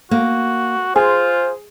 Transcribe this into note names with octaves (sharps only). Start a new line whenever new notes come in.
A#3 F#4
F4 G#4 C5 G#5